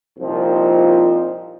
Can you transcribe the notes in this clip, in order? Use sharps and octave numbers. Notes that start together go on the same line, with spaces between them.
C2 A#2 F3 C4 D#4